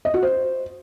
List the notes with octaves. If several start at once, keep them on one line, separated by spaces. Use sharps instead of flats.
D#5
F#4
C5